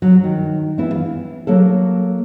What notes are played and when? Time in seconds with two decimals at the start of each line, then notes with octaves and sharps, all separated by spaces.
0.02 F#3
0.24 D#3
0.78 E3 B3 E4
0.94 F5
1.47 F#3 A#3 A4